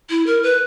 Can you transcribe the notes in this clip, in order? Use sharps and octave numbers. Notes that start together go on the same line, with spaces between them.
E4
A#4
B4